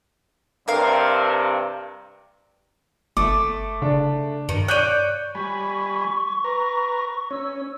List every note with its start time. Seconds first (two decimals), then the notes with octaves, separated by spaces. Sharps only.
0.68 G2 C3 A#4 F5
3.17 G1 A3 D6
3.82 C#3 D4
4.49 G2 D#3
4.68 C#5 D5 F#6 G6 D#7
5.35 G3 G#5 B5 C#6
6.44 B4 A#5
7.31 C#4 C#5 E6